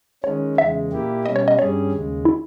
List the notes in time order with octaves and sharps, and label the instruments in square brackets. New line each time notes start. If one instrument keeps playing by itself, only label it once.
[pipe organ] D#3 G#3 C#4 [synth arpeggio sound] C#5
[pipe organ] E2 C#3 G#3 [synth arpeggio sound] E5
[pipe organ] A#2 A#3 E4 G4
[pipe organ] B2 G3 C#4 [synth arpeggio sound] D#5
[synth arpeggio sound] C#5
D#5
[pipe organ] G2 G3 C#4 G#4 [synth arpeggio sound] C#5
[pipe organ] D#2 C#3 G#3
[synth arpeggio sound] E4